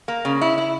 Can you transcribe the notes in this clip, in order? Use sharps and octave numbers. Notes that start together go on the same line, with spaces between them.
A#3
C#3
E4
E4